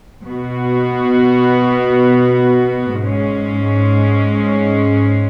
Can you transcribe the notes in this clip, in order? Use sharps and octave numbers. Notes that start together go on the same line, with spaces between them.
B2 B3 F#4
G#2 G#3 C#4